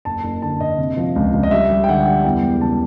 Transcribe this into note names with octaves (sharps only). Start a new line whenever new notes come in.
F#1 A5
F#1
D3 A5
F#1 D#5
C3
F3
C#2
C#2
D#5
G3 E5
G3
G5
D3 F#5
G3
E2 G5
E1
C#3 A5